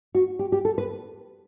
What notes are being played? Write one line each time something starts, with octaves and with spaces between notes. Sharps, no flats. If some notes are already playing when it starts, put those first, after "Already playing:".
F#4
G4
G4
A4
B4